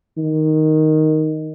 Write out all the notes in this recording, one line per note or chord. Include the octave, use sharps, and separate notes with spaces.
D#3